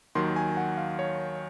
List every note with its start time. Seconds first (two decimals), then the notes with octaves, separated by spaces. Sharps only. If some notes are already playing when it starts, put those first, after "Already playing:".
0.15 D#2 D#3 F#3 C6
0.36 G#5
0.57 F#5
0.77 F5
0.99 C#5